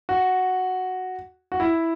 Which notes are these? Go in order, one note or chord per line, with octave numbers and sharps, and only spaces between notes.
F#4
F#4
E4